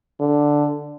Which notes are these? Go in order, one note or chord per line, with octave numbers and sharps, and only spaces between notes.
D3